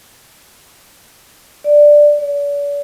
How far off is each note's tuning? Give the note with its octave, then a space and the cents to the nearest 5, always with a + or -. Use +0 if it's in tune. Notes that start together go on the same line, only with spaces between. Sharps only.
D5 +5
D5 -45